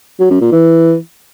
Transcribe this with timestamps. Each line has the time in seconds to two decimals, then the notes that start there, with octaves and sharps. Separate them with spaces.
0.20 F#3
0.30 F#2
0.41 A#2
0.52 E3